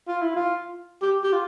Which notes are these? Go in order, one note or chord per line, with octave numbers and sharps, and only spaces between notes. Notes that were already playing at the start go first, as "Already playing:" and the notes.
F4
E4
F4
G4
G4
F4